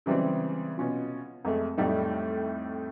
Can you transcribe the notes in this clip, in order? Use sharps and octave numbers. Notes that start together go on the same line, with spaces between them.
C#3 E3 G3 G#3 C4
B2 C#4 F4
F2 G#3 A3
F2 A2 G3 A3 D#4